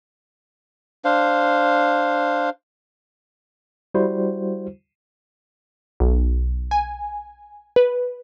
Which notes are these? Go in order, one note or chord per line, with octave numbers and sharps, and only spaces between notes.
D4 C5 F5
G3 E4 F#4 C5
B1
G#5
B4